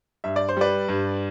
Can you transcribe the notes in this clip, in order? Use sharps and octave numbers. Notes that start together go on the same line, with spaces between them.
G2 E5
D5
C5
G3 B4 D5
G2